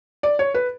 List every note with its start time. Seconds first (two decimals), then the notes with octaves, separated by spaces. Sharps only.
0.23 D5
0.39 C#5
0.54 B4